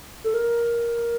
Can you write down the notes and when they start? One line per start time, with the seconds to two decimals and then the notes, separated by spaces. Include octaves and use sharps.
0.24 A4
0.34 A#4